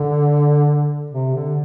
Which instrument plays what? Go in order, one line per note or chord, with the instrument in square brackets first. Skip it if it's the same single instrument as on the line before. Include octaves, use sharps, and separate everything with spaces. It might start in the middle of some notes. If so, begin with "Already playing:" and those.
Already playing: [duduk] D3
C3
D3